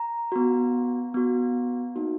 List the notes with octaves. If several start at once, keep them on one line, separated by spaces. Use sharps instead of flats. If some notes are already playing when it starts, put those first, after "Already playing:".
Already playing: A#5
B3 F#4
B3 F#4
A#3 D#4 F#4